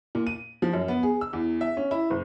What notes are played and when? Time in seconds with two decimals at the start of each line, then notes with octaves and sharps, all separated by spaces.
0.15 A#2
0.27 D#7
0.62 F3
0.73 F#2
0.88 B3
1.03 G#4
1.21 E6
1.33 E2
1.61 E5
1.77 C#4
1.91 E4
2.10 F#1